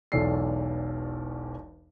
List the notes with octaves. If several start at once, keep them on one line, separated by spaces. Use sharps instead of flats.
E1 B1 E2 A4 D5 C7